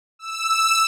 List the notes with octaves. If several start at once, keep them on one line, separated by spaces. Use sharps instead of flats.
E6